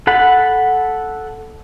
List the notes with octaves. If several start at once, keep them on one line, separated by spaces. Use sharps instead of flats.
A4 F#5 B5